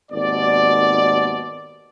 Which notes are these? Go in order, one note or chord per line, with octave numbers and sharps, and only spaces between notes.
G#1 D#2 B2 D5